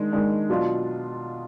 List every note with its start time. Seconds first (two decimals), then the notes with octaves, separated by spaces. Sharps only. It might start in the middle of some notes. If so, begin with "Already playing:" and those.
Already playing: D#3 G#3 D4
0.12 D#3 G#3 D4
0.50 B2 F#3 D4 F4